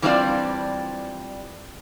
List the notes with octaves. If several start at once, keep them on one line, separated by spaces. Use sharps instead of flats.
E3 G3 C4 D4 F4 D5